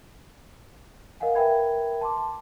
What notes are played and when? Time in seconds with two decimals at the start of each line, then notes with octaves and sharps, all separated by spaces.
1.20 A#4 D#5 F5 F#5 G#5
1.35 A#4 B4 E5 G5 B5 G#6
2.01 A5 C6 D6